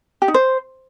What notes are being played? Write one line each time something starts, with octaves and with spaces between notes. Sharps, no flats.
G4
D#4
C5